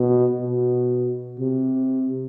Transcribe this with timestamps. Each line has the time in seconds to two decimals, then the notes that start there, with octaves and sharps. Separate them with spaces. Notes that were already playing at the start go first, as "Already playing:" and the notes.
Already playing: B2
0.41 B2
1.40 C3